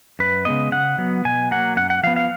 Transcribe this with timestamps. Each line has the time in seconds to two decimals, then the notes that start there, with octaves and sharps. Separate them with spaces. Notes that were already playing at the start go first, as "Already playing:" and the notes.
0.19 F#2 B4
0.45 C#3 G#3 B3 D#5
0.72 C#3 F#5
0.98 F#3 B3
1.25 B2 G#5
1.51 F#3 A#3 F#5
1.76 F#2 F#5
1.90 F#5
2.03 F3 B3 F5
2.16 F5